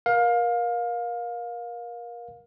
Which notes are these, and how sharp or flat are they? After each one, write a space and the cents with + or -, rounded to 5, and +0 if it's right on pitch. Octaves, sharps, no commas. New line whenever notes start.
A#4 +25 F5 +20